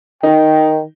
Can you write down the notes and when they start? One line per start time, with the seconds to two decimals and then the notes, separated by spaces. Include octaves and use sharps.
0.23 D#3 D#4 G5